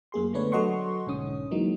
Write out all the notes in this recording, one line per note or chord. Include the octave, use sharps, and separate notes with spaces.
F#2 A#3 G#4 C6
D3 A3 B3 D4 B4 C#5
F#3 A4 D#5 F#5 C6 C#6
B1 G#2 D3 C#4 D#6
E3 F#3 G#3 A#3 D#4